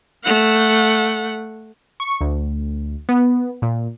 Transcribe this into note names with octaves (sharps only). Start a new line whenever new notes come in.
A3 F#5
C#6
D2
B3
A#2